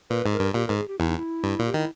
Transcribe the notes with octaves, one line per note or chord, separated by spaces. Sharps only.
A#2 B4
G#2
A#4
G2
A#2 G4
A#4
G#2
G#4
G4
E2 E4
D#4
E4
G2
A#2
G4
D#3 E4